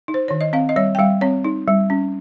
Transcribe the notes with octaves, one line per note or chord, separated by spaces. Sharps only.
D#4
C5
D#3 C#5
D#5
C4 F5
D#5
G3 C#5
G5
G3 F5
C4 C#5
D#4
G3
C#4